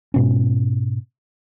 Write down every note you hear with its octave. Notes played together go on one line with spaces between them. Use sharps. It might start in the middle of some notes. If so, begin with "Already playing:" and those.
G#2 B2 C#4